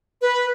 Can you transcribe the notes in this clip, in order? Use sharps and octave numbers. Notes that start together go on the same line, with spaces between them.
B4